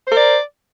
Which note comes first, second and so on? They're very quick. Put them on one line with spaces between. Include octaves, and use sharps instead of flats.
C5 A#4 D5